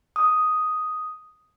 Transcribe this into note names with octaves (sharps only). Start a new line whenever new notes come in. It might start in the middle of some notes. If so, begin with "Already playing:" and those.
D#6